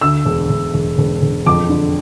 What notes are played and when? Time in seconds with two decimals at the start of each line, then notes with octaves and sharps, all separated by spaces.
0.01 D2 E6
0.25 E1
0.49 E1
0.74 E1
0.98 E1
1.22 E1
1.46 F2 D6
1.69 D3